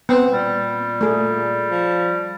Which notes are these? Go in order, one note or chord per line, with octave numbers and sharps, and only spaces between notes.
B3 C4
A#2 G3
A3 G#4
F3